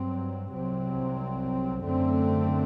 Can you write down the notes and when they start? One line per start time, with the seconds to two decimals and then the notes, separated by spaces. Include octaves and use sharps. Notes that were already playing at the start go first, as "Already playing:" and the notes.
Already playing: G2 F#3 C4
0.55 C2 C3 F#3 C4
1.84 F#2 D3 A3 C4